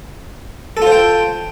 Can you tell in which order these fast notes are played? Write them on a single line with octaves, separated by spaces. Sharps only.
A4 F4 C5 G5